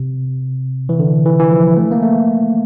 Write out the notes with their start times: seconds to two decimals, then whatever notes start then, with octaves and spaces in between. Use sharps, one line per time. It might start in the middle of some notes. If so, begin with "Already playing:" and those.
Already playing: C3
0.89 E3
0.99 D3
1.25 E3
1.40 E3
1.51 F3
1.77 A3
1.92 A#3
2.02 A3